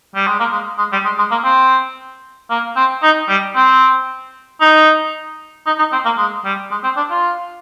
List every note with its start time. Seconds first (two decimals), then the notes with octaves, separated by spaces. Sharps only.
0.15 G3
0.27 G#3
0.40 A#3
0.52 G#3
0.78 G#3
0.92 G3
1.04 G#3
1.18 G#3
1.31 A#3
1.44 C4
2.50 A#3
2.76 C4
3.03 D#4
3.28 G3
3.56 C4
4.61 D#4
5.66 D#4
5.78 D#4
5.92 C4
6.05 A#3
6.18 G#3
6.45 G3
6.71 G#3
6.84 C4
6.97 D4
7.11 F4